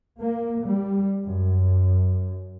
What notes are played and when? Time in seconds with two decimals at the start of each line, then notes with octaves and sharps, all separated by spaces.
0.19 A#3
0.65 G3
1.29 F#2